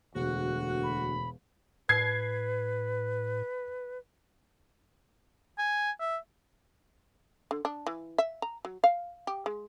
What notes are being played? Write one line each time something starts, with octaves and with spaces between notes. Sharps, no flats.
E1 D2 F#4 F#6
B5
A2 B4 G#6 C7
G#5
E5
D3
D4
E3
E5
A#5
F#3
F5
G4
G#3